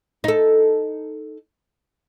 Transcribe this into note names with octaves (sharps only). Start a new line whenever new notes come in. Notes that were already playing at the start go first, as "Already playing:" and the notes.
D#4 A4